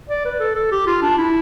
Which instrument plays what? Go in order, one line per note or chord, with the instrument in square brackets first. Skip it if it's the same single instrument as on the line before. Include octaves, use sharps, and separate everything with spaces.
[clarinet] D5
B4
A4
A4
G4
F4
D4
E4